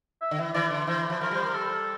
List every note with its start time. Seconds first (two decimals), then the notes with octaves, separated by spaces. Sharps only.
0.21 E5
0.31 D3
0.38 E3
0.54 E3 D5
0.70 D3
0.87 E3 C5
1.10 F3
1.21 F3 A#4
1.31 G3 C5
1.45 A#4
1.54 A4